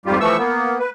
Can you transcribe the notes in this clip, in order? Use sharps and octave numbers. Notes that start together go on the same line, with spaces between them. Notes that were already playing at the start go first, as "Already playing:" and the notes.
F2 G#2 G3 F4 G4
E3 F3 A3 C#6 E6
A#3 B3
B4